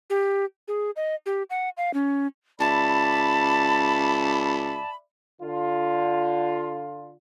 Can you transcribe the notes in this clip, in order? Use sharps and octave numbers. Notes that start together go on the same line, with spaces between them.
G4
G#4
D#5
G4
F#5
F5
C#4
C#2 D5 E5 A5 B5
D3 F4